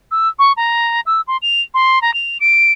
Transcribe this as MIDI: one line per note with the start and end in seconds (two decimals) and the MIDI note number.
0.11 0.28 88
0.39 0.52 85
0.57 1.01 82
1.06 1.21 88
1.28 1.37 84
1.42 1.61 101
1.74 2.02 84
2.02 2.14 82
2.14 2.38 101
2.41 2.72 98